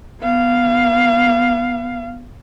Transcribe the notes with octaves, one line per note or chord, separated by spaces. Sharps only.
B3 F5